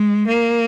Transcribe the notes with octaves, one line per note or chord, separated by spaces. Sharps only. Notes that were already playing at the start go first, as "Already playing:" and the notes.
Already playing: G#3
A#3